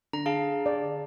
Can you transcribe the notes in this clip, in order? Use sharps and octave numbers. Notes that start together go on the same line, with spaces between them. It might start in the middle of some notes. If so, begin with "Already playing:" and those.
D3 A#5
G#4 F5 A5
D5